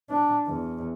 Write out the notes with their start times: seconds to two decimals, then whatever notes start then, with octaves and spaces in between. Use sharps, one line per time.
0.10 D4
0.46 E2